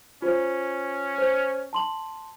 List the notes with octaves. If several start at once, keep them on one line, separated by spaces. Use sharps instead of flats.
C#4 F4 C5
C5
A5 C6 F#7